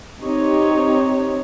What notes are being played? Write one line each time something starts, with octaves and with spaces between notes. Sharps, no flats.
C4 D#4 G4 C#5